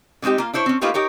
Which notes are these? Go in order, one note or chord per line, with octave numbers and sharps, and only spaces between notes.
D3 G#3 C4 D#4 G4
A#3 F4
D4 E4 C5 C#5
C4 C#4
A3 A#3 D#4 F4 G4 B4
D#4 G4 A#4 C#5